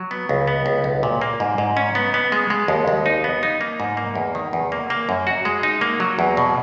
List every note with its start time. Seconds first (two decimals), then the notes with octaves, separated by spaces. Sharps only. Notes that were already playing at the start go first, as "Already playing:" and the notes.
Already playing: F#3
0.11 B3
0.29 C#2
0.48 B3
0.66 C#2
0.84 B1
1.03 A#2
1.21 A#3
1.40 G#2
1.58 G#2
1.77 C#4
1.95 B3
2.14 B3
2.32 G#3
2.50 G#3
2.68 D#2
2.88 D#2
3.06 D#4
3.24 B3
3.43 D#4
3.61 A#3
3.80 G#2
3.97 A#3
4.15 E2
4.35 D#3
4.53 E2
4.72 A#3
4.90 A#3
5.09 F#2
5.27 F#4
5.45 G#3
5.63 D#4
5.81 A#3
6.00 F#3
6.19 E2
6.37 B2